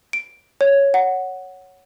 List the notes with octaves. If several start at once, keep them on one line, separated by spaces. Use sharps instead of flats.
D7
C#5
F#5